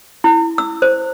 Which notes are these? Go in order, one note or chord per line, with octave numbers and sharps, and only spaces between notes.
E4
E6
C5